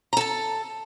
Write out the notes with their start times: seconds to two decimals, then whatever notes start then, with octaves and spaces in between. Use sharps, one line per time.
0.13 A#5
0.17 A4
0.21 A5